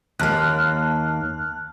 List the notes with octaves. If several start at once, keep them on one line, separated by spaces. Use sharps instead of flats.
D#2 A#3 A5 F6 F#6